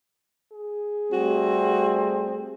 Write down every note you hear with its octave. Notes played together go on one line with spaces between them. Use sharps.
G#4
G3 A3 C4 F#4